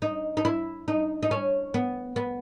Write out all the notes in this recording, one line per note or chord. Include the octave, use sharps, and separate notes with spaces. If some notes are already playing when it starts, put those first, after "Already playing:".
D#4
D#4
E4
D#4
D#4
C#4
B3
B3